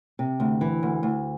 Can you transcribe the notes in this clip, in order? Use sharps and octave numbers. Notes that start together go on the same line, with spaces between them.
C3
D2
E3
D2
D2